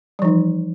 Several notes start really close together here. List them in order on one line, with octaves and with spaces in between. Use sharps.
G3 F3 D#4 E3